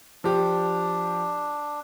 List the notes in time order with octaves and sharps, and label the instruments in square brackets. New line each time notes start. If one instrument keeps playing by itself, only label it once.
[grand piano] F3 G4 [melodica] D4